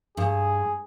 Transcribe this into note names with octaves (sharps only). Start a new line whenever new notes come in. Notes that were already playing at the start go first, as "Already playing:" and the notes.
G2 G#4